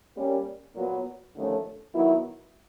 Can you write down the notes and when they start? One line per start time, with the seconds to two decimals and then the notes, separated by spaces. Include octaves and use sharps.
0.16 G3 A#3 C#4
0.75 A#2 F#3 B3
1.35 D#2 D3 F3 A3 C#4
1.94 D#3 F#3 B3 E4